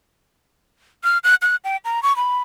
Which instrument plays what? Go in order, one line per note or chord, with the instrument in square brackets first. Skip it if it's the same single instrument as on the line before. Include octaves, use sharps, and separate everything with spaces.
[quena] F6
F#6
F#6
G5
A#5
C#6
B5